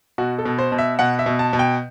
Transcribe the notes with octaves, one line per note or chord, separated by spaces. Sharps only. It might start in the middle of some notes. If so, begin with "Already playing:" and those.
B2 F#4
A4
B2
C5
B2
E5
B2 F#5
E5
B2
A5
B2
G5